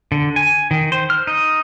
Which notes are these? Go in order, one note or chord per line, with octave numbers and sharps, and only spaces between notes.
D3
G#5
D#3
C5
F6
D#4